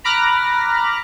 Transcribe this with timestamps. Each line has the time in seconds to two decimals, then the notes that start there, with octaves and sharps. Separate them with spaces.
0.04 A#5 B5 D6 F6 F#6 A#6